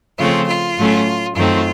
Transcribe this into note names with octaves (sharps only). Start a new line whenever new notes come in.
C#3 F3 A3 C4 F4
F4
A2 F#3 A3 C#4
F#2 D#3 A3 C4 F4